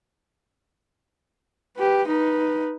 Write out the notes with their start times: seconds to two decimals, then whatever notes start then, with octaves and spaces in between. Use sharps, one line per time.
1.77 G4 B4
2.08 D#4 B4